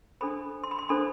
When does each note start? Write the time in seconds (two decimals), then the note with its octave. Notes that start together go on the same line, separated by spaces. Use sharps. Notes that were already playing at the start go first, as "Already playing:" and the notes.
0.21 D4 A4 C5 B5
0.64 C6
0.71 B5
0.79 C6
0.89 D4 A4 C5 B5